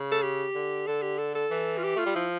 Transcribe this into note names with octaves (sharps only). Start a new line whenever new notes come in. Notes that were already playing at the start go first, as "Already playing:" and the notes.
Already playing: C#3
A4
G4
D3
D3 A4
G4
A4
A4
E3
F4
G4
A3 F4
G3
F3 E4